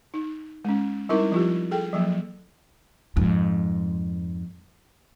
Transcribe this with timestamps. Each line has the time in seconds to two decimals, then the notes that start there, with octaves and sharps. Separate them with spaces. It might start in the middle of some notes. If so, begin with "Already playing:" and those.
0.14 D#4
0.65 G#3 C#4
1.09 G3 C4 D#4 E4 A#4
1.32 F3 F4 G4
1.71 G#4 A4 G5
1.93 F3 F#3 A#3
3.17 F2 G#2